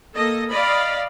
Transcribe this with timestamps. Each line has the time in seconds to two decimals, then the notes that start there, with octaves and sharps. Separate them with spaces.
0.13 A#3 A4 D#5
0.50 D5 D#5 F5 B5